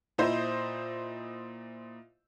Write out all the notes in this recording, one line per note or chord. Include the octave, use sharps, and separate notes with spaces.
A#2 E4 C5 D#5 D#6 G6